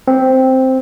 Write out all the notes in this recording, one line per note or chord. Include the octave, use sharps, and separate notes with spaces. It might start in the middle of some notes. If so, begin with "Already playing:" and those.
C4